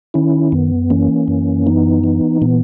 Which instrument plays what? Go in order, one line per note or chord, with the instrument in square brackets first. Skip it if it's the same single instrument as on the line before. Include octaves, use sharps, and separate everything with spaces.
[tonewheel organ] D#3 C#4 E4
F#2 B3
E3 A#3 C#4
F#2
E3 B3 D#4
E3
A#2 B3